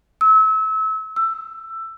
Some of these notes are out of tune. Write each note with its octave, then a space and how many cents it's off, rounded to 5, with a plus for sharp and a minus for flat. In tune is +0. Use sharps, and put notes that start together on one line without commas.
E6 -30
E6 +15